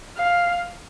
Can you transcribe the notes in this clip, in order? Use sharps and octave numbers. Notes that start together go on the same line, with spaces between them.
F5